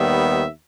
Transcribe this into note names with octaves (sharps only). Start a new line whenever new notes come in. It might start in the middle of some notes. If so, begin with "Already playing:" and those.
Already playing: D#2 D#3 G3 B3 E5